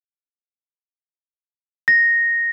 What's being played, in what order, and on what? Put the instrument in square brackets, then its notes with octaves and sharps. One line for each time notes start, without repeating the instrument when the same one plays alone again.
[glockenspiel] A#6